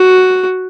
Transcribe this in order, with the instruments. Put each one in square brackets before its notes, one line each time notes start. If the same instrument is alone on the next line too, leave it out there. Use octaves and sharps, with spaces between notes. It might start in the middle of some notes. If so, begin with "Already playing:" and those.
Already playing: [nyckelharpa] F#4